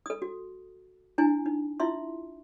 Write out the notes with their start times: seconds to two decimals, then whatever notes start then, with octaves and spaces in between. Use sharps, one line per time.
0.06 A4 D#6
0.22 F#4
1.18 D4 E4 G#5
1.46 D#4
1.80 E4 F4 E5 C6